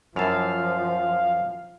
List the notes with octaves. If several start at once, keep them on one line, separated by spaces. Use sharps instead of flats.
F#2 F3 E4 F5 A5